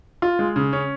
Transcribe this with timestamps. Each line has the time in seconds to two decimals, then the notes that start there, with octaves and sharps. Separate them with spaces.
0.22 F4
0.39 G#3
0.56 C#3
0.73 C#4